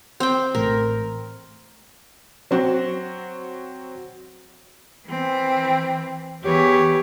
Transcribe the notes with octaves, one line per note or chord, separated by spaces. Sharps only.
C4 G5
A1 A2 A#4
F#3 C4 F#4
E3 C4
E2 E3 G4 C#5